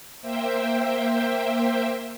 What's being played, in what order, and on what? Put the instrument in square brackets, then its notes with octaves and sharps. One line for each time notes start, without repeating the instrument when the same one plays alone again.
[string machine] A#3 C5 E5 G5